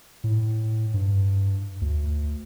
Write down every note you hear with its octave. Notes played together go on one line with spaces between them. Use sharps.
A2
G2
D2